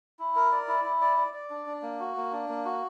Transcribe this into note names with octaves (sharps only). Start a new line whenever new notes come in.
E4
A#4
D5
E4
E4
D5
D5
D5
D4
D4
A#3
F#4
A#3
D4
A#3
F#4